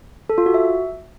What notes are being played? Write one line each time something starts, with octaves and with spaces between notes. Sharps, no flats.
A4
F4
F#4
E5